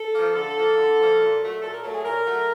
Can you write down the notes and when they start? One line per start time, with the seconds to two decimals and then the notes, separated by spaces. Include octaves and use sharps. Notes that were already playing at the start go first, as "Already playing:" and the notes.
Already playing: A4
0.13 F3 A#3
0.34 D3 A4
0.56 F3 A#3
0.77 D3
0.98 F3 A#3
1.20 A#2
1.41 F#3 A3
1.62 A#2 A4
1.73 A#4
1.83 F#3 A3 A4
1.94 G#4
2.04 A#2 A#4
2.25 F#3 A3